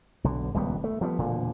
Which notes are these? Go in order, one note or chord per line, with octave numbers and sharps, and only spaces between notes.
B1 D3
D#1 C#2 G3 B3
A3
F3 G3 G#3 B3
E1 A#2 D3